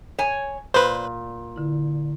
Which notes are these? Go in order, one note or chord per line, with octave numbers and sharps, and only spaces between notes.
C#5 G#5
A#2 B4 C5
D3 E4